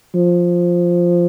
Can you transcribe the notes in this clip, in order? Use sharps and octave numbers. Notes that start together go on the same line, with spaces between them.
F3